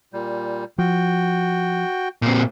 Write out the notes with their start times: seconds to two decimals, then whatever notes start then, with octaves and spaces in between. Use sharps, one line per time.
0.13 A#2 G3
0.78 F3 F#4 G5
2.22 A#2 C4